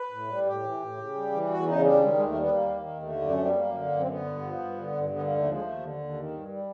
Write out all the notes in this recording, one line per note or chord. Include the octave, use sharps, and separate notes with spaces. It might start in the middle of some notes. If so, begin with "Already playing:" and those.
Already playing: B4
A2
G3
A2 G4
E3
A2
C#3
G3
E3
E2 F#4
C#3 D#4
G3 D4
D#3 G#3
G#3
D#2
A3
G3 B3
D#2 A#3
D#3
D#2
D3 A3
F#2 D4
C#4
G3 C4
B3
F#2 A#3
D3
F#2
C4
D3 B3
G2
F3
G2
D3
G2
D3 B3
D#2 A#3
A3
F3 G#3
D#2 A3
D3
D#2
D#3
G2
G3